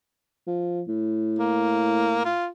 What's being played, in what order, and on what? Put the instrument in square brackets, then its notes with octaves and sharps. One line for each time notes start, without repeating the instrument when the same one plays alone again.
[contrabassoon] F3
A2
[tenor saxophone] A#3
F4